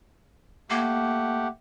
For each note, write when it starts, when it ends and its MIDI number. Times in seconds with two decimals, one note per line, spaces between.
0.70 1.47 57
0.70 1.47 58
0.70 1.47 67
0.70 1.47 78